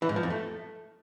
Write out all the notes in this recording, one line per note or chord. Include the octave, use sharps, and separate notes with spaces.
E3
G#2
F3
F2
A3